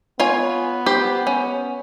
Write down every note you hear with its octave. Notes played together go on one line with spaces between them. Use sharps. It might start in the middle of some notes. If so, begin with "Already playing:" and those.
B3 F4 C#5 G#5
G4 C5
C#4